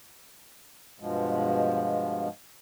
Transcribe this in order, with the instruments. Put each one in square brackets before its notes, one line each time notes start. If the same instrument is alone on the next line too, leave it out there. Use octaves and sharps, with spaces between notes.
[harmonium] G2 B2 F3 G#3